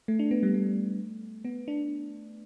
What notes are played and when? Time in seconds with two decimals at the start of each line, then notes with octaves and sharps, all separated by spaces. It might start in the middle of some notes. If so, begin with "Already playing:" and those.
0.08 A3
0.19 D4
0.31 B3
0.43 G3
0.54 A3
1.45 B3
1.68 D4